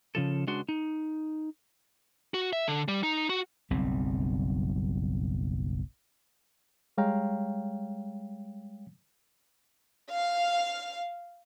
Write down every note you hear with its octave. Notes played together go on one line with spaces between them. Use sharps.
C#3 F3 A4
C#2 G#3 D4 F#4 C6
D#4
F#4
E5
D3
G3
D#4
F#4
F#1 B1 G3 C4
G3 G#3 C#5 F5 G5 A#5
F5